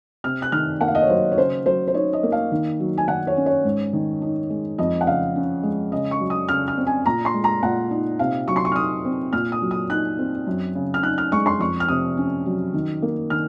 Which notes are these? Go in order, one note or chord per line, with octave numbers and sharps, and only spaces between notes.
C3 F6
F#6
D#3 F6
A#3 F#5
F5
D#5
C#5
F#3 C5
C#5
C#3 C5
F#3 C5
C5
D#4 C#5
D#5
A#3
F5
D#3
F#3
G#5
D#3 F#5
C#5
C#4
C#5
G#2
D#3
D#4
G#3
F2 D#5
F#5
C#3 F5
C#4
G#3
C#3 D#5
C#6
F#3
D#6
C#3 F6
F6
C4
G#5
A#2 A#5
C6
G#3
A#5
A#2 F#5
D#4
C3 F5
F#3 C#6
C6
C#6
F6
D#4 D#6
C4
A#2 F6
D#6
F#3
D#6
D#4 F#6
C4
F#2
C#3
F6
D#4 F#6
F6
G#3 C#6
C6
F2 C#6
F6
C3 D#6
C#4
F#3
D#3
A#3
D#3 F6